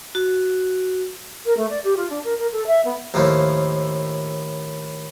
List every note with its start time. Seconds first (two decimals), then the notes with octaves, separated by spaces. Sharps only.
0.15 F#4
1.45 A#4
1.57 A3
1.69 D5
1.84 G4
1.96 F4
2.09 D4
2.24 A#4
2.38 A#4
2.52 A4
2.66 E5
2.84 B3
3.14 D#2 A2 F3